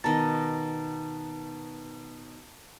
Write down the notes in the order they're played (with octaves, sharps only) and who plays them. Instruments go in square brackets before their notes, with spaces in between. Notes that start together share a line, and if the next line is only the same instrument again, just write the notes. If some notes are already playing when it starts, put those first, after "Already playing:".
[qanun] B2 D#3 D#5 [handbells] A5 A#5 A6